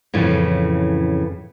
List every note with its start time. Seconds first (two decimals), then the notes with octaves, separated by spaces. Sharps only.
0.13 F2 A2 C#3 E3